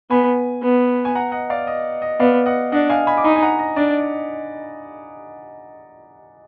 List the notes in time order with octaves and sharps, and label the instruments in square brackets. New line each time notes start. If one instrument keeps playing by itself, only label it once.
[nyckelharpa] B3 [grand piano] G#5 B5
[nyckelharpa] B3
[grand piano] G#5
F#5 A#5
D#5 F#5
D5 F5
D#5
D#5
[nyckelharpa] B3 [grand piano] D5 F5
[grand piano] D#5 F#5
[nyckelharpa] D4 [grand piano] D#5 F#5
[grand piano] F5 G#5
G#5 B5
D6
[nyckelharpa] D#4 [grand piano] G#5 B5
[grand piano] G#5
F#5 A#5
D#5
[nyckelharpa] D4 [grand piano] D5